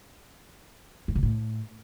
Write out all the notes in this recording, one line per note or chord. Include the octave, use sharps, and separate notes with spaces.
G2
C3
A2